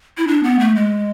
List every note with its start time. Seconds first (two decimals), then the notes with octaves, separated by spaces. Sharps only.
0.18 E4
0.28 D4
0.43 B3
0.59 A3
0.75 G#3